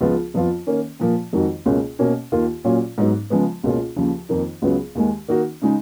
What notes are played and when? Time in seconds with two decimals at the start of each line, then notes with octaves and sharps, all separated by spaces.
0.01 C#2 C#3 F3 B3 F4
0.34 F2 F3 B3 F4
0.67 D#3 A#3 C#4
1.00 A#2 F3 A#3
1.33 F2 D#3 G#3 D#4 F#4
1.66 C#2 B2 A#3 C#4
1.99 B2 A#3 C#4
2.32 D#2 D#3 A#3 F4
2.64 A#2 F#3 C#4 F4
2.98 G#2 F#3 B3 D#4
3.30 C#3 F3 G#3 B3
3.64 C#2 B2 A#3 C#4 F4
3.96 D#2 C#3 F3
4.29 F2 D#3 A#3 D#4
4.62 C#2 C#3 F#3 B3
4.95 D#2 D#3 G#3
5.28 D#3 A#3 D#4 F#4
5.62 C#3 G#3 D#4